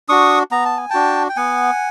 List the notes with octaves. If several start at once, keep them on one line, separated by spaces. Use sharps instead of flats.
D4 F#4 C#6 D#6
B3 A#5
A5
G#5
D4 F#4 G5 A5
G5
B3 F#5 G#5